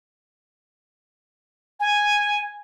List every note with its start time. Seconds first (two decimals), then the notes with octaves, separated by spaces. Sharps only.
1.80 G#5